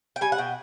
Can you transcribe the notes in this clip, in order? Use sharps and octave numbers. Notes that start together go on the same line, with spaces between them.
G5
G3 G#5
F#5
B2 G5